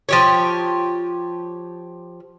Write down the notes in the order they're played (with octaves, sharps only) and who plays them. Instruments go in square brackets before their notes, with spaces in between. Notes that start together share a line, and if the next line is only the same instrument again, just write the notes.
[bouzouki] F3 G4 C#5